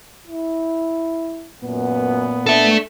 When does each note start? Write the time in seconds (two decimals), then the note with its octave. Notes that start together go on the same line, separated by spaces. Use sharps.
0.27 E4
1.62 F#2 A#2 B3
2.46 D4 A4 E5